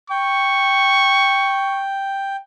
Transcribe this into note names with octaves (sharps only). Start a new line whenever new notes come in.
G5 C#6